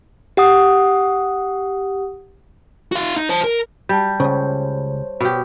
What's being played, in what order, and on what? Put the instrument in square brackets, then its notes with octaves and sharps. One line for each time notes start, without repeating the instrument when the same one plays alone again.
[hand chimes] G4 F#5 D#6
[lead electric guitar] F#4 F5
D#4
C5 A5
A#4
[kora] G3 [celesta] A5 G6
[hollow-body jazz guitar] C#2 C#3 [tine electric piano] C5 C#5
[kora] B2 G4